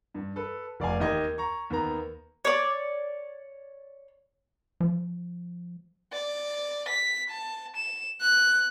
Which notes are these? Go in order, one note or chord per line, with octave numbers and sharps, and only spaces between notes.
G2
A4 B4
F1 D5 F5 G#5
D#2 G4 D#5 G#6
A#5 C#6
D#2 B3 A#5
C#5 D5
F3
D5
B6
A5
E7
F#6